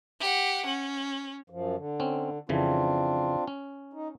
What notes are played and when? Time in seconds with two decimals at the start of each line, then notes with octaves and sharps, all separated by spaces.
0.20 G4 F#5
0.67 C#4
1.50 F#2 F3
1.76 D3
2.00 C4 C#4
2.49 F2 C#3 E3 C4 D4 F4
3.48 C#4
3.93 D#4